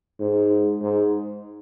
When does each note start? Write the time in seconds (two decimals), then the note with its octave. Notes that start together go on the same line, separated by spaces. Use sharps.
0.20 G#2
0.81 G#2